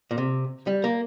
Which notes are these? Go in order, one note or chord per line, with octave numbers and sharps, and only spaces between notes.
A#2
C3
G3
A#3